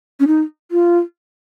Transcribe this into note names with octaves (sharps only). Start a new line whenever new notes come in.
C#4
D#4
F4